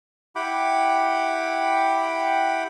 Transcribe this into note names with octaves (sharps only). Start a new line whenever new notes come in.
E4 G4 F#5 G5 B5 D6